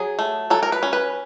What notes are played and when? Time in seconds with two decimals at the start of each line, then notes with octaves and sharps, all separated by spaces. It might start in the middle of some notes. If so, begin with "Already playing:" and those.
Already playing: F#3 G#4
0.19 A3
0.50 F#3 A4
0.63 A#4
0.72 B4
0.83 C#4
0.93 B4